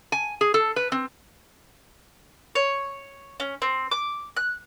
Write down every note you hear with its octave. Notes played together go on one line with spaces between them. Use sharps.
G#5
G#4
A4
B4
C4
C#5
C#4
C4
D6
F#6